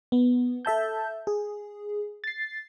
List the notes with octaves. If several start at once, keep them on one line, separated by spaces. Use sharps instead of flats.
B3
A4 E5 A5 G6
G#4
A6 C7